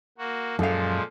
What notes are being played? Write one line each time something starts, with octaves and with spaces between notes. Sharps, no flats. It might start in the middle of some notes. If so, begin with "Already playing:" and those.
A#3 F#4
F#2 A#2 F3 G#3 A4 F5